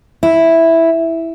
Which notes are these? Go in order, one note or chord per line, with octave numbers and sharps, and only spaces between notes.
E4